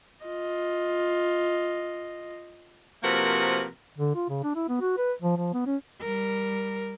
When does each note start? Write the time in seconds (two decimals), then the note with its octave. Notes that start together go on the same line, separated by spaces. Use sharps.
0.25 F4 D#5
3.03 C3 F3 A#3 F#4 A#4 B4
3.98 D3
4.15 F4
4.29 C#3
4.43 D4
4.55 E4
4.69 B3
4.81 F#4
4.97 B4
5.22 F3
5.37 F3
5.54 B3
5.66 C#4
6.02 G3 A#4